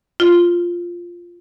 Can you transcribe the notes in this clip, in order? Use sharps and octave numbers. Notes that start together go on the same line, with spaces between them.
F4